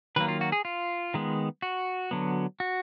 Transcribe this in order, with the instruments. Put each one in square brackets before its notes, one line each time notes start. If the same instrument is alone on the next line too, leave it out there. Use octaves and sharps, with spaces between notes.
[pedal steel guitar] D#3 F#3 A#3 B4
F4
F#4
G#4
F4
D#3 G#3 B3
F#4
D3 F#3 B3
F#4